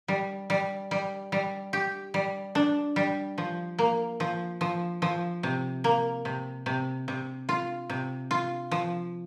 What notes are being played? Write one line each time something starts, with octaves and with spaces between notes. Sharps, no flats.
G3
G3
G3
G3
G4
G3
D4
G3
F3
A#3
F3
F3
F3
C3
A#3
C3
C3
C3
F4
C3
F4
F3